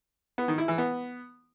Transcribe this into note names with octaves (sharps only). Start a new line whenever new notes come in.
B3
D#3
E4
E3
B3